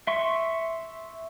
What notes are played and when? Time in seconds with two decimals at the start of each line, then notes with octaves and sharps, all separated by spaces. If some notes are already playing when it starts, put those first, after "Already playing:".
0.07 E5 C6 C#6